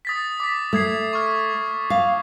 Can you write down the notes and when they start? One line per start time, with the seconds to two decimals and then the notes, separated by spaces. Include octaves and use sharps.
0.05 D#6 A6 B6
0.40 D6 B6
0.73 A3 D#6 G#6 C7
1.13 C#6 F6
1.90 F5